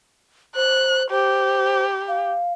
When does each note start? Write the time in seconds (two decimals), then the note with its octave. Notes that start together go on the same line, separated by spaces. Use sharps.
0.56 C5 F#6
1.11 G4 C5
2.08 F5